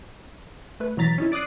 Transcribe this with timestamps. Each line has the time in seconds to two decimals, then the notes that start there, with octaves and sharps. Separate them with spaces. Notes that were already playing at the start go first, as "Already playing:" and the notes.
0.80 A3 B4
0.97 B2 E3 F#3 A#5 A6 B6
1.18 C#4 D#4 E4
1.32 D5 D6 D#6 F#6 C7